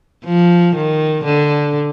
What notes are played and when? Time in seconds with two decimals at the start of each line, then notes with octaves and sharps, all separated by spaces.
0.25 F3
0.75 D#3
1.25 D3